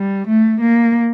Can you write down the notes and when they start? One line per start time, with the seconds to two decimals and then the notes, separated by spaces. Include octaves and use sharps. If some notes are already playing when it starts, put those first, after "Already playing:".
Already playing: G3
0.27 A3
0.61 A#3